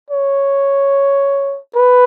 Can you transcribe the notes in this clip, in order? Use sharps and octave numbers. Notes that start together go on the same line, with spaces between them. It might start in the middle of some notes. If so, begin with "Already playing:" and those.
C#5
B4